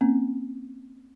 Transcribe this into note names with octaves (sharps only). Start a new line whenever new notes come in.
A#3 C4 C#4